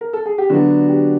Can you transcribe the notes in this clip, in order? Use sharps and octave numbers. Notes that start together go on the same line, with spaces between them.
A#4
A4
G#4
G4
D3 F#3 B3 D4 F#4
G4